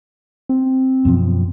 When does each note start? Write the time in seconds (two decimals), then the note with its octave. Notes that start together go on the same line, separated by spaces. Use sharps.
0.49 C4
1.05 F#2 B2 F3